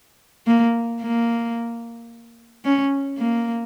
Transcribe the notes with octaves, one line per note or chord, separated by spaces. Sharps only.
A#3
A#3
C#4
A#3